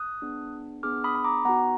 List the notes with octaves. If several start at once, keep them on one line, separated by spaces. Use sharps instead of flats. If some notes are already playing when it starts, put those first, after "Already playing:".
Already playing: D#6 F#6
B3 D4 G#4
B3 D4 G#4 D6 F6
B5 D#6
B5
A#5 D6
B3 D#4 F#4 F#5 A#5